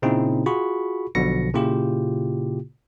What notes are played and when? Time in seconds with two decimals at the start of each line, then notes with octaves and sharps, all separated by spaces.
0.02 A#2 C#3 C4 D#4 E4
0.46 F4 F#4 G#4 B5 C#6
1.15 B1 B2 D3 F3 A#6 C#7
1.54 A#2 C#3 A#3 E4 F4 G4